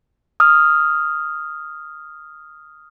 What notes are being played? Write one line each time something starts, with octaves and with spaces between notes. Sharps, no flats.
D#6 F6